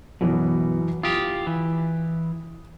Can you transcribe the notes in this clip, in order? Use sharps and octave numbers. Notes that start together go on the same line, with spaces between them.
F#2 B2 E3
F4 G4 D#6
E3